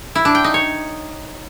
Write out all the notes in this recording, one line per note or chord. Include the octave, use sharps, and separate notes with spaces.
E4
D4
G5
D#4
C#5